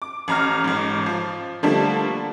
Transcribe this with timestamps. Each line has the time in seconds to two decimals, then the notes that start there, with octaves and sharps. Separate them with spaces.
0.02 D6
0.28 A1 A#5 F6
0.64 A1 G#2
1.06 F3
1.63 D3 F3 G3 A3 A#3 D4